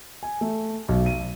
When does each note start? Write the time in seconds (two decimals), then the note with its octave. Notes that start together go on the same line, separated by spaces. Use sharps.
0.23 G#5
0.41 A3
0.89 B1
1.06 D#7